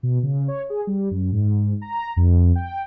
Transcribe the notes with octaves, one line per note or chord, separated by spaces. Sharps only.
B2
C#3
C#5
G#4
G3
F#2
G#2
A#5
F2
G5